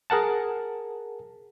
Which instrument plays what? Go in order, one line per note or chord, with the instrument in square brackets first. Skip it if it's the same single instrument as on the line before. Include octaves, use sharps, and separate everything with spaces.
[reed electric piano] G#4 A#4 F#5 A5